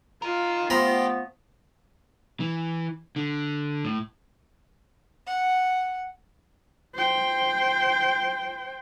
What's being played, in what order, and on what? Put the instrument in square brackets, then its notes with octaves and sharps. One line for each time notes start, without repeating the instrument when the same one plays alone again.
[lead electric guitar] D#4 A#4 [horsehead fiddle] F4
[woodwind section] F3 A3 B3 [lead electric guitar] G4 [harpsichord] C5 A#5 B5
[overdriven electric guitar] E3
D3
A2
[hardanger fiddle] F#5
[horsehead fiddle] C5 G5